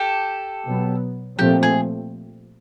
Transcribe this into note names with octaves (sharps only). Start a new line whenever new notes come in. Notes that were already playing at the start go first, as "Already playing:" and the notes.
Already playing: G4 A4
B2 F#3 B3
A#2 F3 A3 C4 G4
G#4